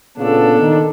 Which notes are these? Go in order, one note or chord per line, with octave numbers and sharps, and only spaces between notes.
A#2 C#3 B3 D4 A4
D#3